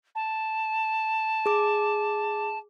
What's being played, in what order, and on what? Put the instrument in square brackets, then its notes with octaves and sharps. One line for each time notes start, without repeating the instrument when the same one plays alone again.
[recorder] A5
[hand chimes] G#4 D6